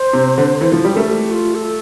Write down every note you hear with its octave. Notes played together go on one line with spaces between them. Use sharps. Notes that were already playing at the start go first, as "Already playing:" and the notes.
Already playing: C5
C3
D3
E3 C5
F3 F4
G3 G4
A3 A#4
A4
G4
F4
A4